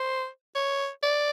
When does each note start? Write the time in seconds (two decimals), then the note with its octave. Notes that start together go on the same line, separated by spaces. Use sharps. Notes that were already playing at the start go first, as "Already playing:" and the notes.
Already playing: C5
0.56 C#5
1.03 D5